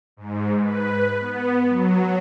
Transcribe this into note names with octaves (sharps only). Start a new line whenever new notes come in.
G#2
B4
B3
F#3